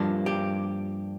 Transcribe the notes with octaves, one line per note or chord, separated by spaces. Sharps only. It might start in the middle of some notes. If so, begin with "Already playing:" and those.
Already playing: G2 F3 A#3 D4
G4